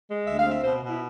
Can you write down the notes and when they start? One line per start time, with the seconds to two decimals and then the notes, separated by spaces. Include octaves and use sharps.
0.09 G#3
0.27 D2 E5
0.38 F5
0.45 C4 E5
0.64 B2 C5
0.83 B2
0.89 E4